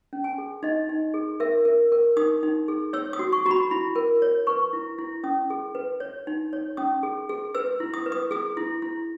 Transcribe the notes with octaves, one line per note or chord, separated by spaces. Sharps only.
C#4
G#5
G#4
D#4 D#5
D#4
G#4
A#4 E5
A#4
A#4
D#4 D#6
D#4
G#4
C#5 E6
D#6
F#4
C#6
F#4 A#5
B5
E4 B5
A#4
C#5
B4 C#6
E4
E4
C#4 D#6
G#4
B4
C#5
D#4
C#5
C#4 D#6
G#4
G#4
B4 E6
E4
D#6
B4
D#6
G#4 D#6
E4
E4